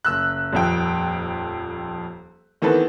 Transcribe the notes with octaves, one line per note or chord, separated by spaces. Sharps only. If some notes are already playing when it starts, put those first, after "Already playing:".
F#1 E6 F#6
D#1 F2 G5
D#3 E3 B3 C4 A4 B4